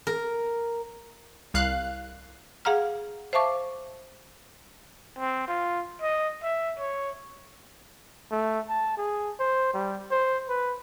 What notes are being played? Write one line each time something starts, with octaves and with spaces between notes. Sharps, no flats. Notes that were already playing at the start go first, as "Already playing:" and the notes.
A#4
C2 F5 F#6
G#4 F5 F#5 A#5 F6
C5 E5 F5 A5 C#6 D6
C4
F4
D#5
E5
C#5
A3
A5
G#4
C5
G3
C5
B4